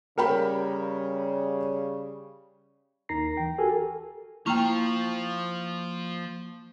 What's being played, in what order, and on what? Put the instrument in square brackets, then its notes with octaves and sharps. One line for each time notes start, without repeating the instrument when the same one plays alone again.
[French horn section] C#3 G3 [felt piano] A#4 G5 B5
[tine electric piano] D#2 D#4 A#4 A#5 A#6 C7
E3 G5
F#4 G4 A4 A#4 G#5
[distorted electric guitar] F3 F4 [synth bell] A#3 C#6 F7 [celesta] E4 G5